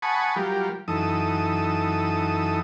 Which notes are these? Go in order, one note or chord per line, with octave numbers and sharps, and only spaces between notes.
F#5 G#5 A5 B5 C#6 D#6
F#3 G3 F4 G4 A#4
F#2 E3 D#4 A4 D#6 E6